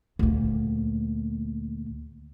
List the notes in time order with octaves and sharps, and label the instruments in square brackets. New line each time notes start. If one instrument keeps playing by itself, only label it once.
[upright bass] D2 A#2